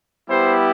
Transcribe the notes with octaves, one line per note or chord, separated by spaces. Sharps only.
G3 B3 E4 G4 C5